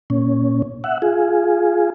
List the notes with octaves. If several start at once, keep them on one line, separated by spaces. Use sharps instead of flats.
A#2 C#4
E5 F#5
F4 G#4